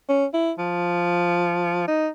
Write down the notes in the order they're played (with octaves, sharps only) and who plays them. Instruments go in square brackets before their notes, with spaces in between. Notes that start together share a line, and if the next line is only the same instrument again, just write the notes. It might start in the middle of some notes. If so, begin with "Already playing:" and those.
[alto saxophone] C#4
E4
F3
D#4